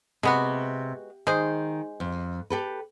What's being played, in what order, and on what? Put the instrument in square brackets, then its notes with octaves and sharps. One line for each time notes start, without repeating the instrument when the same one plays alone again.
[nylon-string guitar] C3 [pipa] G#3 B3 F#4
[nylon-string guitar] D#3 [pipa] G#3 G#4 C5
[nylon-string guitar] F2
G4 A4 B4